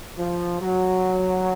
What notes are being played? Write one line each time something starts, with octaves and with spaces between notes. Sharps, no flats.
F3
F#3